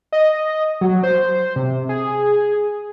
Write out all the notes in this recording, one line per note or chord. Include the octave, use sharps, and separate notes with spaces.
D#5
F#3
C5
C3
G#4